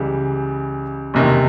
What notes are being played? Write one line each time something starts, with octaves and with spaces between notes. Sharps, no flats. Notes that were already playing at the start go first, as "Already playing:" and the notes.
Already playing: C#2 C#3 E3 G3
F#1 E2 C3 D#3